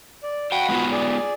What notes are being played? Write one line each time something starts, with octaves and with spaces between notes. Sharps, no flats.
D5
F#4 F5 G5 B5
G#3 B3 F4
G#4 D5